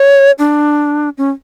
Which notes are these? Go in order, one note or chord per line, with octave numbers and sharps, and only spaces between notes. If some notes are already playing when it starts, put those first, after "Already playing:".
Already playing: C#5
D4
C#4